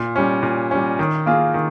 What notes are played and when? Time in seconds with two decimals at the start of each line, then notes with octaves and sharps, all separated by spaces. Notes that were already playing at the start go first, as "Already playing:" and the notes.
Already playing: A#2
0.16 G3 C#4
0.43 A#2
0.71 G3 C#4
0.99 D#3
1.26 A#3 F4 G#4
1.54 D#3